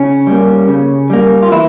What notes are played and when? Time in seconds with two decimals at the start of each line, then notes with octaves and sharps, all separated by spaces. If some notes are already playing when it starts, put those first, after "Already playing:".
Already playing: C#3 C#4
0.27 G3 A#3
0.68 C#3
1.10 G3 A#3
1.43 F4
1.52 E3 E4